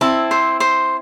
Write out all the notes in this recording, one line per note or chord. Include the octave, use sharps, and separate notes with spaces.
C4 E4 A5
C5
C5